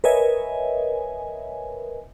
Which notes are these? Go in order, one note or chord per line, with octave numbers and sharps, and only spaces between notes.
A#4 B4 C#5 D#5 E5 G#5